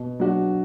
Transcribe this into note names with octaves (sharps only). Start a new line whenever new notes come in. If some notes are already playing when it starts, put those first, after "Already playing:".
Already playing: B2
F#3 D4 F#4